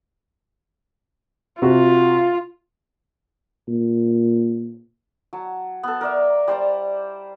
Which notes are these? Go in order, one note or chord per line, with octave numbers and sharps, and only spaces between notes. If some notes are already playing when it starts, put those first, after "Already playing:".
C3 F4 F#4
A#2
F#3 A5
B3 A4
A#4 D5 E5
G3 C5 A5 A#5